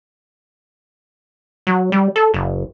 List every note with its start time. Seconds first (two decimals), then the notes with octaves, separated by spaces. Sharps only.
1.67 F#3
1.92 G3
2.16 A4
2.34 F#1